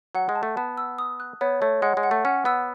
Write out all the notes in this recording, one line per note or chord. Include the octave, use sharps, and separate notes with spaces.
F#3 F#5
G#3
A5
A3
B3 A5
E6
D#6
F#6
B3 C#5
A3 C#5
G#3 F#5
G#3
F#5
A3
C#4 F#5
B3 E6